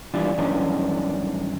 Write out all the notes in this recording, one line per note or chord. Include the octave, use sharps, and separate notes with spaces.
E3 G3 D4 F4
G2 D#3 E3 F#3 C#4 D4